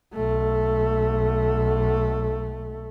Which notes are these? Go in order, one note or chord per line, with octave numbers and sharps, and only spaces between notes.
B1 A3